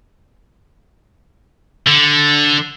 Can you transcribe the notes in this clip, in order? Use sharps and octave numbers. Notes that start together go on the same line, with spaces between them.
D3